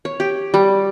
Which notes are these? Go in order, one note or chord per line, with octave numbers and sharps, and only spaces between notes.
C#5
G4
G3